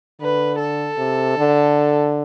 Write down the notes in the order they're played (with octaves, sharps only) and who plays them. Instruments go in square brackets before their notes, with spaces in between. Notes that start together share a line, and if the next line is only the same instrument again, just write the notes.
[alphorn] D3 [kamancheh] B4
[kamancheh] A4
[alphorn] C3
D3